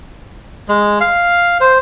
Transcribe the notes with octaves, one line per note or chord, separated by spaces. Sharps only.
G#3
F5
C5